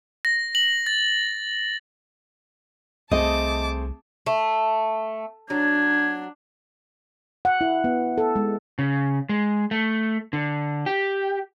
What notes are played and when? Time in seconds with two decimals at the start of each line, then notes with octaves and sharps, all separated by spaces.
0.25 A#6
0.55 F#7
0.86 A6
3.11 C2 A3 C4 G#4 D#5 A5 D6
4.26 A3
5.50 F#3 D4 G#6
7.45 F#5
7.61 E4
7.84 B3
8.18 A4
8.36 G#3
8.79 C#3
9.29 G#3
9.71 A3
10.33 D3
10.86 G4